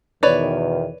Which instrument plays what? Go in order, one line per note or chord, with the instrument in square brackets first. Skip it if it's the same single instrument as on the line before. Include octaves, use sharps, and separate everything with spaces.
[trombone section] E2 B2 D#3 [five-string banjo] B4 C#5 D5